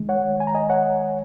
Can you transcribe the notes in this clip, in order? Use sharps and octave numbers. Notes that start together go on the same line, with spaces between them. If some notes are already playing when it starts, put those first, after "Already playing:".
Already playing: D#3 G#3
C#5 F#5
G#5
A#5
D#5 G#5
C#5 F#5